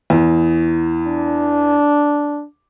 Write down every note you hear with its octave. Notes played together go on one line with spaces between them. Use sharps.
E2
D4